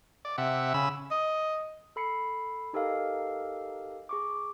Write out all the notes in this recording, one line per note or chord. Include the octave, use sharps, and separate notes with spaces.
D5
C3 E5 F#5
C#3 B5 E6
D#5
A4 B5 C7 C#7
D#4 G4 A4 A#4 D#5 F5
G#4 C#6 D6